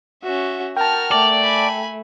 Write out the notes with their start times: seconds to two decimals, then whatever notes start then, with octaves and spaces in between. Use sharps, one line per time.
0.23 C#4 F#4 E5
0.77 F#4 A#4 G5 A5 F6
1.11 A3 D5
1.42 G#5 B5